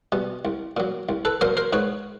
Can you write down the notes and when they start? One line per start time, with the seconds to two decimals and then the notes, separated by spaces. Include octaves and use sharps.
0.12 B2 G3
0.45 C2
0.77 A#2 F#3
1.09 C2
1.25 A4 B4
1.41 A#2 F#3 A#4 C5
1.57 A#4 C5
1.73 G#2 B4 C#5